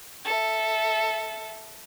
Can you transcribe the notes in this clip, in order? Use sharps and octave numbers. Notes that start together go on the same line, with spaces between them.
A4 E5